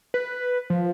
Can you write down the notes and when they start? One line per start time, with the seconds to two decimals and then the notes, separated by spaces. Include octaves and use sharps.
0.14 B4
0.70 F3